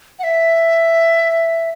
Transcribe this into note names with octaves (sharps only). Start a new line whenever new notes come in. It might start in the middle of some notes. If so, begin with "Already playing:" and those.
F#5
E5